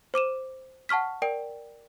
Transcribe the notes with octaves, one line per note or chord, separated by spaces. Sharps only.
C5 D6 D#7 E7
F#5 A5 C#6 F6 B6
A#4 D5 G5 D7